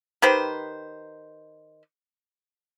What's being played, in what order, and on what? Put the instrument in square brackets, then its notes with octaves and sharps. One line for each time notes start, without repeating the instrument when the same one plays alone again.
[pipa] D#3 G4 B4 C5